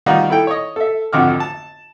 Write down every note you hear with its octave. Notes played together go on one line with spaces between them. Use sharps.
D#3 G3 D#4 F4 F#4
E4 A4 G5
C#5 D#5
A4 E5
G#1 F2 D3 F#4 D6 F6
A5